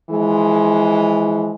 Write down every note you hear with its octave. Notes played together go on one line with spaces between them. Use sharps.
E3 F3 G#3